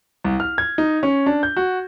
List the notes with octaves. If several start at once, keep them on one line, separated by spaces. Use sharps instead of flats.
C2
F6
G#6
D#4
C#4
D4
G6
F#4